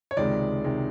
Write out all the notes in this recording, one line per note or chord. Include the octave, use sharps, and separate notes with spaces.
C#5
C#2 C3 D#3 G#3 D5
C3 D#3 G#3